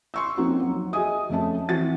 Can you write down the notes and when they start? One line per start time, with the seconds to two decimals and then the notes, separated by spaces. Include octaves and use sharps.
0.14 C6 C#6 E6
0.37 F3 A#3 C4 C#4 D#4 F#4
0.61 F#3
0.93 F#4 G#4 D#5 E5 G#5 D#6
1.30 F2 A3 C#4 E5 A5
1.69 E3 C4 F#4 A6